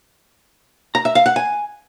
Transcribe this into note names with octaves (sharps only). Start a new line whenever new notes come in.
A#5
E5
F5
F#5
G#5